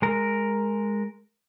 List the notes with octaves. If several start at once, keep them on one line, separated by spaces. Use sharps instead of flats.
G#3 A#4